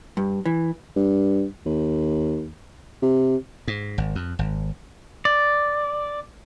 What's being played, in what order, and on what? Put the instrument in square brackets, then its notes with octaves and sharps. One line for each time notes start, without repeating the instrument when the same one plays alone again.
[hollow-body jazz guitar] G2
E3
[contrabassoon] G2
D#2
C3
[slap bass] G#2
G#1
F2
G#1
[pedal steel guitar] D5